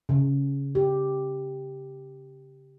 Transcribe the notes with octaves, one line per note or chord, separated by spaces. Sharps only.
C#3
G4